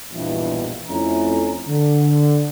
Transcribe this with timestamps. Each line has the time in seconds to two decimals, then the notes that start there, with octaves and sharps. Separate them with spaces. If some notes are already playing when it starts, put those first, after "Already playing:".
0.11 A#1 E2 G2 B2 E3 G3
0.89 F2 A3 C#4 E4 A#5
1.67 D3